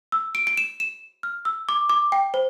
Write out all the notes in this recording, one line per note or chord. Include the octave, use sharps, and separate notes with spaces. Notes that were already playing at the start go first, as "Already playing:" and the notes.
E6
D7
D7
E7
E7
F6
E6
D6
D6
G5
C5